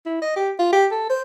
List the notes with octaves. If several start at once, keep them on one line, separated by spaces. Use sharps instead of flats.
E4
D#5
G4
F4
G4
A4
C5